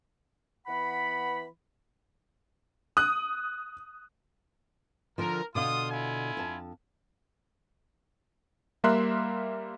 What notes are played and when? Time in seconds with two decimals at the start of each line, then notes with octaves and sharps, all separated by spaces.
0.67 E3 B3 F#5 B5
2.97 D#6 F#6
5.18 D3 F3 A#4
5.55 B2 D3 F4 F5 C6 D#6
5.91 E4 F4 G#5
6.37 F2 A5
8.84 G3 A#3 A#4 E5 C6 F#6